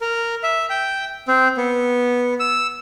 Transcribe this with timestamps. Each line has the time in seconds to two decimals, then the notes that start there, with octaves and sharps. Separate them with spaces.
0.01 A#4
0.43 E5
0.70 G5
1.28 C4
1.57 B3
2.40 E6